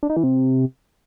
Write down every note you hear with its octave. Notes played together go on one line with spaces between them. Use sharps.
D4
D#4
E3
C3